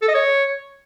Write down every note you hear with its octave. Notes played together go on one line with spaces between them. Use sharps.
A4
D#5
C#5